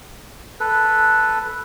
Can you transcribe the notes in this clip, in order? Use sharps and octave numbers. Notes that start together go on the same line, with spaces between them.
A4 B4